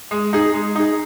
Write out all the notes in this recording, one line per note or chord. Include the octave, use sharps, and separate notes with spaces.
G#3
D#4 G#4
G#3
D#4 G#4